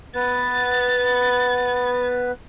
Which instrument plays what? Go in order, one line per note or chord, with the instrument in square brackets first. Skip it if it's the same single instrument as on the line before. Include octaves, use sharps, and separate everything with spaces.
[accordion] B3 B4 [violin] A6